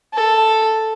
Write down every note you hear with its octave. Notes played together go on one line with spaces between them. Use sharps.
A4